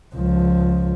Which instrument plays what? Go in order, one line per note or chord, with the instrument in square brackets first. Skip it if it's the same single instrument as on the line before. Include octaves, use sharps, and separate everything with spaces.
[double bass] C#2 F3